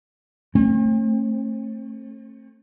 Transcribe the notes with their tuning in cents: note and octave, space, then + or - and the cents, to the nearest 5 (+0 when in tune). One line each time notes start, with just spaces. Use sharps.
A3 +15 C4 +45